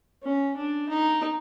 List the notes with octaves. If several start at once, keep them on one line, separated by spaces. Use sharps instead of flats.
C#4
D4
D#4